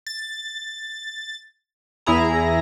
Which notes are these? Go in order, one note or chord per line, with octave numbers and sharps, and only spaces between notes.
A6
E2 E4 G#4 A#5